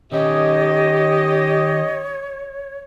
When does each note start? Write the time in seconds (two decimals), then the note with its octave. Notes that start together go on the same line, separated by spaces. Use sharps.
0.13 D#3 C#4 G4 C#5 D#5